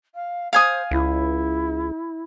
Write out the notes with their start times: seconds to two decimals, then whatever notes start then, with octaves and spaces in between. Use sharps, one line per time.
0.14 F5
0.53 C5 F5 G#5 D#6
0.91 C#2 E4